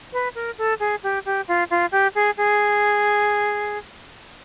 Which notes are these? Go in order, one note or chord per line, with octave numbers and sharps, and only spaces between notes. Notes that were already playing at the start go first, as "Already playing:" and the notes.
B4
A#4
A4
G#4
G4
G4
F4
F4
G4
G#4
G#4